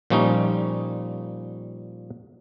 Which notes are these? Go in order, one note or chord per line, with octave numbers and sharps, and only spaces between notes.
A#2 F3 G3 C#4 D#4